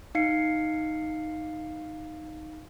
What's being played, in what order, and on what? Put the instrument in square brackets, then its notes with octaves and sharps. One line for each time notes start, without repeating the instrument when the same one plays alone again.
[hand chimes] D#4 F5 C7 C#7